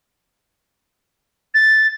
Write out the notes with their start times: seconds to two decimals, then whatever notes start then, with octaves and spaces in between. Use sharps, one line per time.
1.54 A6